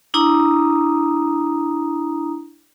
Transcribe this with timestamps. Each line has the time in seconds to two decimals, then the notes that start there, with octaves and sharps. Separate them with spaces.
0.14 D4 E4 A#5 D#6